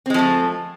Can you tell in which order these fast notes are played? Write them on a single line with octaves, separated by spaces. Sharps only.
C4 G#3 F3 A3